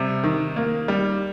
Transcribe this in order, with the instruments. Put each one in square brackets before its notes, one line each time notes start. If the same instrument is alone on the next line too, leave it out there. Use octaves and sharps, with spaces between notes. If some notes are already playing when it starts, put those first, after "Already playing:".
Already playing: [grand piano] C3 G3
D#3
A#3
G3